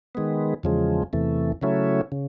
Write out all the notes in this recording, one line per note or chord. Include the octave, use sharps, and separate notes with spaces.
D#3 G#3 B3
E2 C#3 F3 G#3
E2 C3 E3 A3
C#3 F#3 A3 C#4 E4
C#3